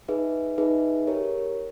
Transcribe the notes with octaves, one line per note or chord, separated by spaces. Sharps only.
D#4 G#4 B4 E5
D#4 G#4 B4 E5
G4 A#4 C#5